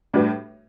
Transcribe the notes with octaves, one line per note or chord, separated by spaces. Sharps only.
A2 G3 D4 F#4 B4